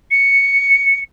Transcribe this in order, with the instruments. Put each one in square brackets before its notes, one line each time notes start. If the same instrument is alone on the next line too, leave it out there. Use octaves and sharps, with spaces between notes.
[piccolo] C#7